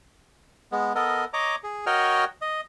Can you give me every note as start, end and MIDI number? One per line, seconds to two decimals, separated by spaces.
0.72 0.93 56
0.72 0.93 59
0.95 1.25 59
0.95 1.25 69
0.95 1.25 70
0.95 1.25 75
1.33 1.56 73
1.33 1.56 75
1.33 1.56 82
1.33 1.56 86
1.63 1.85 68
1.86 2.24 66
1.86 2.24 70
1.86 2.24 73
1.86 2.24 75
1.86 2.24 79
1.86 2.24 89
2.42 2.61 75